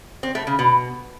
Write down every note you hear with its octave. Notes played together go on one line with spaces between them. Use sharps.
C4
A3
C#3
B2